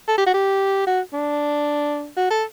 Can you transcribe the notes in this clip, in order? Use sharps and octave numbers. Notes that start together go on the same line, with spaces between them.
A4
G4
F#4
G4
F#4
D4
F#4
A4